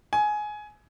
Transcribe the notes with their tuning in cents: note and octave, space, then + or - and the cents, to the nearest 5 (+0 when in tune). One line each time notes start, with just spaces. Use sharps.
G#5 +15